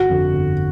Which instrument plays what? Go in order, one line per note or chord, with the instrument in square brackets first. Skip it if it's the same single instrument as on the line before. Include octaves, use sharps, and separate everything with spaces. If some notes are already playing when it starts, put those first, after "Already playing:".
Already playing: [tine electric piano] G1 [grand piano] F#4
[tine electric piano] F2 D3
G1